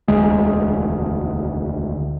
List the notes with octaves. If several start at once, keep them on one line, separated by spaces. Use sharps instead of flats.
E1 D2 G#3